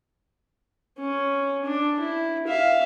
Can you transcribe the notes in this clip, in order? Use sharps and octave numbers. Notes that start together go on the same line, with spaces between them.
C#4
D4
E4
E5 F5